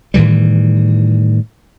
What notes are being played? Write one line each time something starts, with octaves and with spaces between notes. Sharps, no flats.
A2 D#3 E3 G3